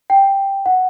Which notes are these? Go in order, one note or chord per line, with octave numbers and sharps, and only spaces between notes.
G5
F#5